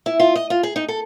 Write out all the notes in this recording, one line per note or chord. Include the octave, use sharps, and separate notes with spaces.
E4
F4
D#5
F4
G#4
D#4
A4